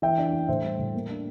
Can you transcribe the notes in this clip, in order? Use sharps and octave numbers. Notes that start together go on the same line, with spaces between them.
E3 E5 G5
D4
E3
A2 C5 E5
G3
A2
A#3
D4